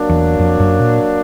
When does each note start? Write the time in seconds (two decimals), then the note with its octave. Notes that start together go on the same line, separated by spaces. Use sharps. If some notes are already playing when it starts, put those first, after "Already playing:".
Already playing: F#3 A#3 D4
0.09 E2
0.39 F2
0.60 F#2
0.80 A#2